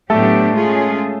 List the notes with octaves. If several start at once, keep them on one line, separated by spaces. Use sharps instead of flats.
A2 F#3 A3 B3 D4 G4 A4
G#3 C#4 F4 G#4